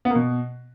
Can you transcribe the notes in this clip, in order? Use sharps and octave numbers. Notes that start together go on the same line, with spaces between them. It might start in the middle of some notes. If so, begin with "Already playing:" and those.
B3
A#3
B2